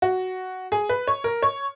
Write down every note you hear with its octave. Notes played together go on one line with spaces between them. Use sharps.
F#4
G#4
B4
C#5
A#4
C#5